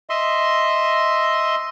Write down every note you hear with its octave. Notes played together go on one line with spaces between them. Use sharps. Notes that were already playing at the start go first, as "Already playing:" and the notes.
D#5 E5 C6